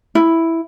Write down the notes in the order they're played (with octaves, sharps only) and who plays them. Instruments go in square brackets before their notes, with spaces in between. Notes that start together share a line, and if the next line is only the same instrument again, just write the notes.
[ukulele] E4